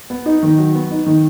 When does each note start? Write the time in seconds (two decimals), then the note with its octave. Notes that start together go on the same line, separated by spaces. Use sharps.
0.10 B3
0.26 D#4
0.43 D#3
0.58 F#3
0.75 B3
0.91 D#4
1.06 D#3